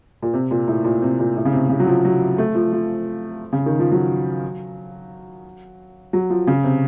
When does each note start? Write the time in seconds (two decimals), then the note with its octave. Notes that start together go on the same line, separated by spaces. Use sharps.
0.23 A#2
0.34 C3
0.51 A#2
0.68 A2
0.85 A#2
1.02 C3
1.19 A#2
1.36 A2
1.45 C#3
1.53 C3
1.69 C#3
1.80 F#3
1.87 F3
2.05 F#3
2.38 A3
2.55 F3
2.72 F3
3.53 C#3
3.66 D#3
3.79 F3
3.92 F#3
6.13 F#3
6.30 F3
6.47 C#3
6.64 C3